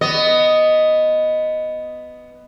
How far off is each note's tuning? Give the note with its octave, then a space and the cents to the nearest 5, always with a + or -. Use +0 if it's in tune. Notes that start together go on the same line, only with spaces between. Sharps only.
B3 +10 D#5 +0